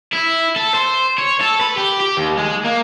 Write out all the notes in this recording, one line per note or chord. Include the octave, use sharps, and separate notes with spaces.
E4
A4
C5
C#5
A4
B4
G4
G4
D#2
G#3
A#3